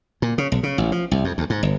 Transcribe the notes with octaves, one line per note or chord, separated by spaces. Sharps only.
A#2
C#3
B1
C#3
A1
F3
C2
F2
D2
G#2
G1